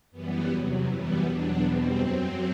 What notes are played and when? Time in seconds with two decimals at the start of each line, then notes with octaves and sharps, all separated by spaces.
0.11 F#2 E3 G3 B3
0.48 E2 C3 F#3
0.85 F#2 E3 G3 B3
1.22 E2 B2 F#3 D4
1.59 E2 B2 G3 C4
1.96 F#2 F#3 C4